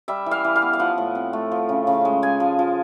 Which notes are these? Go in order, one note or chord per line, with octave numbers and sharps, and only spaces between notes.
G3 E5
E3
F5
E3
F5
B3
F5
F3 F#5
A2
C4
A3
F3
C#3
C#3
G#3
G#3 G#5
F3
F3